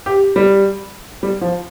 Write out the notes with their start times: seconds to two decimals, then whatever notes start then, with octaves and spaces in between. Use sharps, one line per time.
0.06 G4
0.36 G3
1.23 G3
1.41 F3